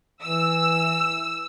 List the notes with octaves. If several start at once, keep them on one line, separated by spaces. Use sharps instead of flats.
E3 E6